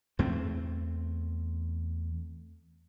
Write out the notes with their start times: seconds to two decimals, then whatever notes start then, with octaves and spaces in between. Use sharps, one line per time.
0.19 E2 A3 C4